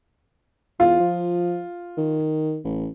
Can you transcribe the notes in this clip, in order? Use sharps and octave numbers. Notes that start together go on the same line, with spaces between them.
E2 F4
F3
D#3
A1